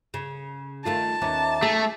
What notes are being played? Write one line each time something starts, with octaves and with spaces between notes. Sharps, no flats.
C#3
D#3 A3 F4 A5
D#2 B3 C#4 E5 A#5 D6
A3 G#4